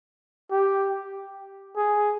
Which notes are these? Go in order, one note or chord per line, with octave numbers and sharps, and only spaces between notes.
G4
G#4